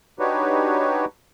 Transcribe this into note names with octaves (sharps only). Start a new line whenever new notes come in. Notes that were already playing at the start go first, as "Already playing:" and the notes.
D4 D#4 F#4 G4 B4 C#5